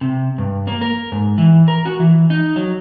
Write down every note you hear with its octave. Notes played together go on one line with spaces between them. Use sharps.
C3
G2
A#3
A#4
G#2
E3
A#4
F#4
E3
D#4
F#3